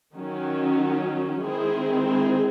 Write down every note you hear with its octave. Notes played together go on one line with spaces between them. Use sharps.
D#3 F#3 C#4
D#3 G#3 C4 E4 G#4
E4 G#4